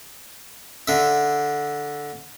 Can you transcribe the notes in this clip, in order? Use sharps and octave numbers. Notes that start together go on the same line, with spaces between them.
D3 E5